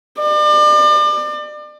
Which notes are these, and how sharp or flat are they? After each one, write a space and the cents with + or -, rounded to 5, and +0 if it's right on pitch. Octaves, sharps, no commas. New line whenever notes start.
D5 +35